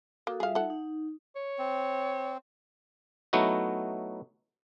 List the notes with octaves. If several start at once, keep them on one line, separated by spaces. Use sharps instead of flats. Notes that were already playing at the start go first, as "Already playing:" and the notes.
A#3 F#4 A4 D#6
G3 F4 G#4 E5 F5
D#4 A4 F#5
D#4
C#5
C4
F#3 A3 B3 D#4 E4 F#4